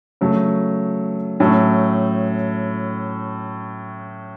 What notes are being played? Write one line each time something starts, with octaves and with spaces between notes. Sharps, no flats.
C#3 F#3 A3
A2 F#3 A3 C#4